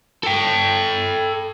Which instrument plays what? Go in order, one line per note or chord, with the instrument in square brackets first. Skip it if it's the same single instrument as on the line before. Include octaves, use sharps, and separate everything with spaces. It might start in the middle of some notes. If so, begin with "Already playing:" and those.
[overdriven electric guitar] A4 G5